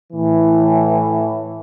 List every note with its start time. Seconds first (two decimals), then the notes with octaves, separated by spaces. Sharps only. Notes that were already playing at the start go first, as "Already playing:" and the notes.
0.13 A2 E3